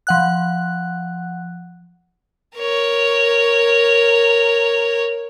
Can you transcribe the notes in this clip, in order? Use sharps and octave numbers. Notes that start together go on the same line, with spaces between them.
F3 F#5 F#6
A#4 C#5